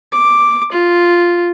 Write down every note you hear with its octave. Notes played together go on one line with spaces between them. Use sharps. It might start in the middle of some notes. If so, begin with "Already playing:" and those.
D6
F4